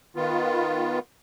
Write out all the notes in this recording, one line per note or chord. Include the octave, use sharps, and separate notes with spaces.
D#3 B3 F4